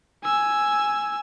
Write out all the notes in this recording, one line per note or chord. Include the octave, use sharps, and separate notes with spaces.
G#5 E6